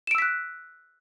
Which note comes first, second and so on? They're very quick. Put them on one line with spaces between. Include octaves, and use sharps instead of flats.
E7 D7 E6 B6 F#6